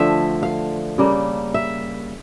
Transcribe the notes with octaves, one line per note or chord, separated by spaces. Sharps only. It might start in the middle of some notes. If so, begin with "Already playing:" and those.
Already playing: D3 F3 A3 E5
F5
C#3 G3 A#3
E5